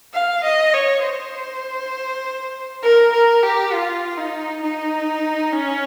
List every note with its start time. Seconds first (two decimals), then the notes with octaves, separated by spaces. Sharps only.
0.14 F5
0.44 D#5
0.74 C#5
1.03 C5
2.83 A#4
3.13 A#4
3.43 G4
3.73 F4
4.17 D#4
4.63 D#4
5.52 C#4